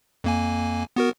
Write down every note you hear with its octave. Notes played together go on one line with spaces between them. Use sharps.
F2 A#3 G#5
B3 F#4 A#4